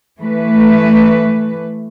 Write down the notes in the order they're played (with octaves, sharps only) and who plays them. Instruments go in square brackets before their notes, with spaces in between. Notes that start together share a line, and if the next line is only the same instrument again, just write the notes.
[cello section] E3 A3 B4